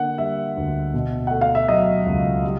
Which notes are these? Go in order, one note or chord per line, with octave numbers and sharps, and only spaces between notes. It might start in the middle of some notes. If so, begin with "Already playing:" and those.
Already playing: D3 A#3 F#5
G3 E5
D2
B2
A3 F#5
F5
E5
F#3 D#5
C#2
G3